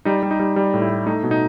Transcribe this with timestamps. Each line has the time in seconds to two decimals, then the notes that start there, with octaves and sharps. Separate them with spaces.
0.05 G3 D#4
0.23 G3
0.31 D#4
0.40 G3
0.56 G3
0.74 A2
0.82 E4
0.90 G3
1.06 A3 D#4
1.24 B2
1.31 D#4